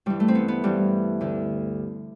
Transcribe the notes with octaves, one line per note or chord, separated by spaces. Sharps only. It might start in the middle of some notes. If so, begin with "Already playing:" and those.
G2 E3 G3
A3
C4
B3
B3
G2 E3 G3
D2 D3